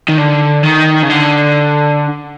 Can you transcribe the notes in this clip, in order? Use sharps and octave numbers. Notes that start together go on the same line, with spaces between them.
D#3
D3
D#3
C#3
D3